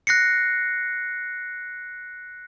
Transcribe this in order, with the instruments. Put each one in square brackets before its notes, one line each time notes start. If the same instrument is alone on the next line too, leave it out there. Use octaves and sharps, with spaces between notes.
[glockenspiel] F#6 A#6 C7 C#7